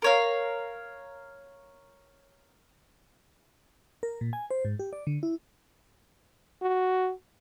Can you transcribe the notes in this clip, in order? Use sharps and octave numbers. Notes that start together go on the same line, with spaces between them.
A#4 C#5 F5
A#4
A#2
G#5
C5
G#2
G4
D5
D3
E4
F#4